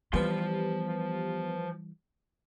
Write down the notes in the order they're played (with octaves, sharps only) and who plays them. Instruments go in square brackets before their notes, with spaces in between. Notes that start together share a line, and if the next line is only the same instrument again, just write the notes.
[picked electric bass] E3 G3 [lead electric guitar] F3 C6 [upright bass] B3 [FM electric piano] G4 B4